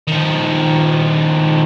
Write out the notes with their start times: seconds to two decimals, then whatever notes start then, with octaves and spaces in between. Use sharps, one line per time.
0.07 D#3 F3